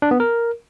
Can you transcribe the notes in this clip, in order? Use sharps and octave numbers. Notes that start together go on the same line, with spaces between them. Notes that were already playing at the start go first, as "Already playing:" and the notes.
D4
B3
A#4